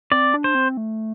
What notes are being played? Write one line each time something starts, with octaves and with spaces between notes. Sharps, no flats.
C4 D5
D4
C5
C4
A3